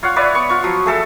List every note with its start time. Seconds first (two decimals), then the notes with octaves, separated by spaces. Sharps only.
0.03 F4 C#5 F5 F#5
0.16 B4 C#5 D5 E5
0.34 B3 C#6
0.49 F4 C#6
0.64 F3 F#3
0.86 A3 G#4 A4 E5